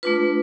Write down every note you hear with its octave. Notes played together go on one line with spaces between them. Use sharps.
A3 D4 F4 B4